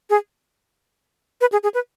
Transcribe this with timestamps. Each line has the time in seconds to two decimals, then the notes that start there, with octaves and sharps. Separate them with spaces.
0.10 G#4
1.41 B4
1.52 G#4
1.63 G#4
1.74 B4